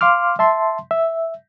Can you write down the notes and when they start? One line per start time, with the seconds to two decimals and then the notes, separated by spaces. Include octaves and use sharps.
0.01 F5 C6 D6 F6
0.39 E5 A5 C6
0.91 E5